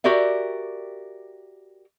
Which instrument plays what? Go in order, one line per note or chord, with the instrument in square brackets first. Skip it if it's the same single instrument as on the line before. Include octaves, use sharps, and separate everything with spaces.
[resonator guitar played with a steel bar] F#4 G4 A#4 D5 E5